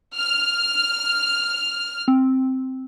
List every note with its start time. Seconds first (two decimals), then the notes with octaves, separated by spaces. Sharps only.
0.17 F6
2.08 C4